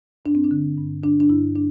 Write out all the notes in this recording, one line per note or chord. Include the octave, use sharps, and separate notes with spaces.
G2 D4
C4
D4
D3
G2
D3 D4
D4
G2 E4
D4